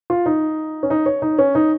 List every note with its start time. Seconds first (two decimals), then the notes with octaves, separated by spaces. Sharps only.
0.10 F4
0.26 D#4
0.83 C#4
0.90 D#4
1.06 C#5
1.22 D#4
1.38 C#4
1.55 D#4